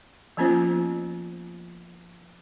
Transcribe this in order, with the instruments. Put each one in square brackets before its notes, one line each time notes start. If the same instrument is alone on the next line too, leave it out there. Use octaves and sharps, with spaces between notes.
[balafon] F3 A#3 B3 C#4 F4 C5